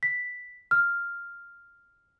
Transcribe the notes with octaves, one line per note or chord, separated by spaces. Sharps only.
B6
F6